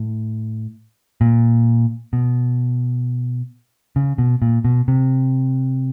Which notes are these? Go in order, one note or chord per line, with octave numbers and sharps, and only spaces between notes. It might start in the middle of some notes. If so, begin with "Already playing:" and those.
Already playing: A2
A#2
B2
C#3
B2
A#2
B2
C3